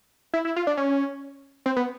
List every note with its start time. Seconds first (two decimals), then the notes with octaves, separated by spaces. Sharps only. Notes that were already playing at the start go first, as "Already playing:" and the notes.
0.34 E4
0.45 E4
0.56 F4
0.67 D4
0.77 C#4
1.66 C4
1.76 B3